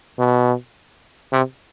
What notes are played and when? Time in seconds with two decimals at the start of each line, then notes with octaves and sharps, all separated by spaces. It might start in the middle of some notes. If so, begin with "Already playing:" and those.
0.19 B2
1.33 C3